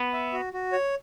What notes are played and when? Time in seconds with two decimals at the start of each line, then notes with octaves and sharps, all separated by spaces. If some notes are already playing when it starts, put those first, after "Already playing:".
Already playing: B3
0.13 E5
0.33 F#4
0.53 F#4
0.72 C#5